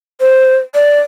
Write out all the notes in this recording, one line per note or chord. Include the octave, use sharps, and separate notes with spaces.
C5
D5